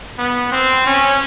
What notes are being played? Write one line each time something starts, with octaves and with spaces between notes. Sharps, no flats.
B3
C4
C#4